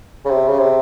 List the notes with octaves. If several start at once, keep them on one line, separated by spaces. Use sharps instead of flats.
C#3
C3
C#3
C3